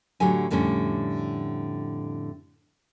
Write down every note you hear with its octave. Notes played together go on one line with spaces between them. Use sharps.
A2 D3 F#3 C#4 G4 G#5
F2 A2 D3 G3 C#4